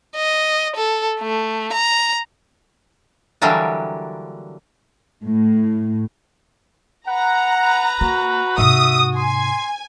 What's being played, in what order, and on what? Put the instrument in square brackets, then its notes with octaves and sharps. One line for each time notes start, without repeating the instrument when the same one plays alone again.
[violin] D#5
A4
A3
A#5
[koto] D3 E3 F#3 G3 A#3 D4
[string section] A2
[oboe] B4 [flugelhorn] F#5 [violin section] A#5
[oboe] B4
[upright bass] A#3 [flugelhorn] F#4
[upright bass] G#2 C3 [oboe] E5 [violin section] D#6
[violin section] G#5 [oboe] C6